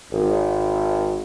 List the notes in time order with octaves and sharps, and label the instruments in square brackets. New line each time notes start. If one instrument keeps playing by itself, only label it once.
[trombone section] G#1